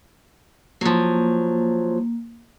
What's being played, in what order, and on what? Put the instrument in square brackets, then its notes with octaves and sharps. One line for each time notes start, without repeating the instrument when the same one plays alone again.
[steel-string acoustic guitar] F3 F#3 [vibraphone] A#3